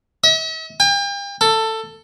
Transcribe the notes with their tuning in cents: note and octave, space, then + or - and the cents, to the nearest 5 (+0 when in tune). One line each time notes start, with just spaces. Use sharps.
E5 -45
G5 +40
A4 +15